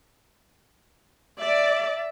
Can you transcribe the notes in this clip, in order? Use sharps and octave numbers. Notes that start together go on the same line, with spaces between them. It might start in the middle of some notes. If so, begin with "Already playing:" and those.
D5 E5